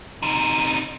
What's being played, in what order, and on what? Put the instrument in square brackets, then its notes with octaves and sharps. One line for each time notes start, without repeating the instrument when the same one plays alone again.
[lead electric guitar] C3 D#4